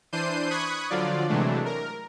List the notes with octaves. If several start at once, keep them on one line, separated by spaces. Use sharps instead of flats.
E3 D4 C5 G6 C7 D#7
B5 C#6 D#6 F#6 G#6
D3 F3 F#3 F4 D5
C3 E3 F#3 G#3 A3 D4
A#4